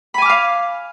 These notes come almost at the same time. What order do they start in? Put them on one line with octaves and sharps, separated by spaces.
B5 G#5 D6 F6 F5